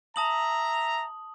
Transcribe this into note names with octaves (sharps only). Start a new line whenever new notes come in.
E5 A5 A#5 D#6 F#7